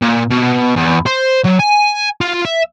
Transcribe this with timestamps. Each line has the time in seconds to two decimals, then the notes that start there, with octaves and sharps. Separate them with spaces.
0.02 A#2
0.30 B2
0.76 E2
1.06 C5
1.45 F#3
1.60 G#5
2.21 F4
2.45 E5